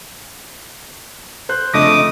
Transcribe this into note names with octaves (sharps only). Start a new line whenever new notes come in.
C5 F#6
F2 C#3 A3 D4 D#5 D6 D#6 A#6